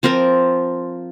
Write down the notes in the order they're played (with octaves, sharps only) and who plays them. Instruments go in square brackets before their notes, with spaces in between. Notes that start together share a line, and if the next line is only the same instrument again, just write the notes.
[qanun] F3 C4 F4 A#4